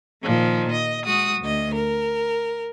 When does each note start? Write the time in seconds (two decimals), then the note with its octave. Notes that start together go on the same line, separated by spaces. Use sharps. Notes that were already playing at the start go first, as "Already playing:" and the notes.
0.23 A#2 D#3 F3
0.71 D#5
1.03 G#3 F#4 D#6
1.41 D2 D#5
1.74 A#4